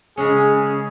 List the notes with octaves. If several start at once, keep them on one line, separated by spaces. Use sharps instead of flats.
C#3 G#3 C#4 G#4